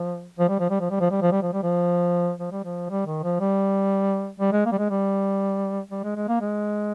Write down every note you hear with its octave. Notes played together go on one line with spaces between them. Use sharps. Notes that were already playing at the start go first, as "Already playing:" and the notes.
Already playing: F3
F3
G3
F3
G3
F3
G3
F3
G3
F3
G3
F3
G3
F3
F3
G3
F3
G3
D#3
F3
G3
G3
G#3
A#3
G3
G#3
G3
G3
G#3
G#3
A#3
G#3